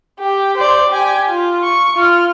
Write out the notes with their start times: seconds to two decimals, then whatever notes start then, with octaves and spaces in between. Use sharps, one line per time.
0.20 G4
0.57 C5 D5
0.90 G4 G#5
1.29 F4
1.63 C#6
1.96 F4 F6